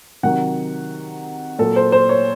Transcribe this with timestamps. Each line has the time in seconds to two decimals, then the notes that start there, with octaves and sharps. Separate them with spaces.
0.23 C3 D#3 F#3 F#5
1.59 A#2 F#3 A4
1.76 C5
1.92 C5
2.09 C#5